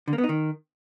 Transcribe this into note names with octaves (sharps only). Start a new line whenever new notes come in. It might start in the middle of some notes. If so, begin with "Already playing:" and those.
D3
A#3
B3
D#4
D#3